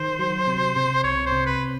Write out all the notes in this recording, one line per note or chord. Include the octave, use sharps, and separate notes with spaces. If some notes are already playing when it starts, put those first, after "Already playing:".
Already playing: D#3 C5
F#3
C3
C3
C2 C#5
C5
C3
B4